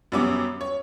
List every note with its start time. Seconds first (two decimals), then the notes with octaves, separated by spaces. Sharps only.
0.12 F#2 G3 B3 C#4 D6
0.61 C#5